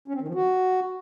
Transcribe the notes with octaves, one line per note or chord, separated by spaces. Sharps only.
C#4
C4
D#3
F3
F#4